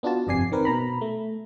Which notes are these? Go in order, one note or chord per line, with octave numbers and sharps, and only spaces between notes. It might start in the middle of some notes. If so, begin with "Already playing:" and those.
B3 D4 F4 F#4 A5
G1 F2 C3 D5 G#5 C7
D#3 C4 A#4 B4
B2 A#5 B5
A3